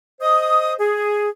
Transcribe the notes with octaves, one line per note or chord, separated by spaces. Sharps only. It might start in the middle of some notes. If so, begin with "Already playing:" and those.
C5 D#5 D#6
G#4